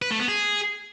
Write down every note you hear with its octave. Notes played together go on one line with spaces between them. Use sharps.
B4
A3
B3
G#4